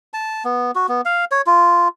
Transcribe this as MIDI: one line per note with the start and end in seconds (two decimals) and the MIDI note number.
0.14 0.43 81
0.45 0.71 59
0.75 0.86 66
0.89 1.01 59
1.05 1.25 77
1.31 1.42 73
1.47 1.88 65